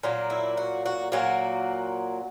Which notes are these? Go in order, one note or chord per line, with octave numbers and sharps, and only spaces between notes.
A#2 F#3 A#3
E4
F#4
F#4
A#2 F#3 A#3 F#4